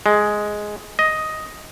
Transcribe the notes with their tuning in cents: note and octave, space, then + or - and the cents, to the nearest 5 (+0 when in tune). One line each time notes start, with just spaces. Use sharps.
G#3 +5
D#5 +5